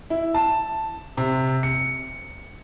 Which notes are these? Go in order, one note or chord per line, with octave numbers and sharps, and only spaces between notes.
E4
A5
C3
C#7